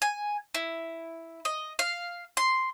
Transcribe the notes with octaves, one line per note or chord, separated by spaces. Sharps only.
G#5
E4
D#5
F5
C6